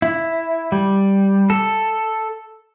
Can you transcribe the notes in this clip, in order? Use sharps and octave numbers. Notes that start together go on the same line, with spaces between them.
E4
G3
A4